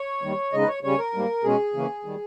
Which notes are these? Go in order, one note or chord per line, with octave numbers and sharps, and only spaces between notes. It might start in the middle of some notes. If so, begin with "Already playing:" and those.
Already playing: C#5
D#2 D#3 G3
C#3 G#3 D#4 D#5
B4
C#5
C#3 G3 C#4 C#5
A#4
G#2 G3 A#3
B2 G#3 C#4 G#4
C#3 E3 A#3 C#4
D#3 G3